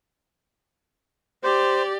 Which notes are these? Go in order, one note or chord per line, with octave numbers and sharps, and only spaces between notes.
G4 C5 D5